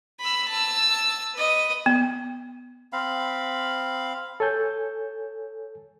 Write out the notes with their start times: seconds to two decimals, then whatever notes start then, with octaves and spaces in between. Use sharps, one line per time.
0.20 B5 E6
0.49 A5 E6
1.35 B4 D#5
1.86 B3
2.93 C4 F5 B5
4.40 A4 C#5 G#5 G6